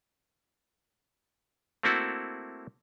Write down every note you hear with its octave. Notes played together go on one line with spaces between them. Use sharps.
A3 A#3 C4 E4 F#4 A4